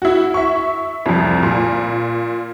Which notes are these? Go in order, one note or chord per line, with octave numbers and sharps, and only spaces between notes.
E4 F#4
E5 C#6
C2 F2
A#2